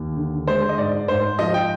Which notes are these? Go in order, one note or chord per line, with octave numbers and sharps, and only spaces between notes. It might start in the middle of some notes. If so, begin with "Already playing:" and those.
Already playing: D#2
D3
G#3 C5
D#5
G#2 D5
G#2 C5
F3 D#5
G5